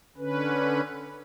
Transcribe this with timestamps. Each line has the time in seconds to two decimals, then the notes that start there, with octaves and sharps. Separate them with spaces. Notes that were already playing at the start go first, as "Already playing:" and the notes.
0.18 D3 C#4 B4